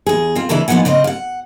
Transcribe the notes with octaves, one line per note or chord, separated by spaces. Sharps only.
E2 G#4
C4 F4
D2 C#3 E3 D4 E4 E5
D#2 F3 B3 E4 F#5 G#5
C#3 C4 C5 D#5
F5 F#5